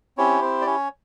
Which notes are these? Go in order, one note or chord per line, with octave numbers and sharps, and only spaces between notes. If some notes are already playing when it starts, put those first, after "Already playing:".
C4 C#4 E4 G4 C#5
C4 C5
D5
C#4 C#5